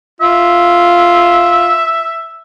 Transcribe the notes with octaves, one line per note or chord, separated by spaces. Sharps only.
F4 E5